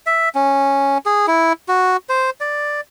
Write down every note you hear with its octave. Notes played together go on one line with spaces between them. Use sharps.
E5
C#4
G#4
E4
F#4
C5
D5